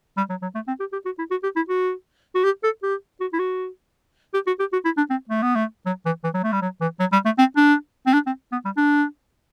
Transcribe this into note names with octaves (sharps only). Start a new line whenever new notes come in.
G3
F#3
F#3
A3
C4
G4
G4
F#4
E4
F#4
G4
E4
F#4
F#4
G4
A4
G4
F#4
E4
F#4
G4
F#4
G4
F#4
E4
D4
C4
A3
B3
A3
F#3
E3
E3
F#3
A3
G3
F#3
E3
F#3
G3
A3
C4
D4
C4
D4
C4
B3
G3
D4